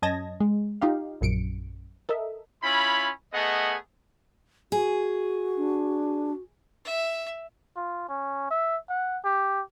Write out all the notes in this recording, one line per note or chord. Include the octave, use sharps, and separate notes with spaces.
F#2 C#4 D#5 A5 G#6 A#6
G#3
D#4 F4 G4 F5
A#1 F#2 C#7 D7
A4 A#4 D#5 E5
C#4 E4 F4 B5
A3 B3 G#4 D#5 F#5
F#4 G#4
D4
E5
F4
C#4
E5
F#5
G4